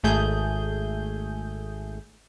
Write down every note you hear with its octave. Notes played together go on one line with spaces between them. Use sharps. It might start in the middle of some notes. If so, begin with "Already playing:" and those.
G#1 A3 G#4 G6